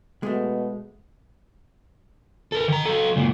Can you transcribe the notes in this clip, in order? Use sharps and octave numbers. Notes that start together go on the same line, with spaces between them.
B2 G#3 A3
A4 A#4
D#3 A#5
F#3 A4
C#2 A#2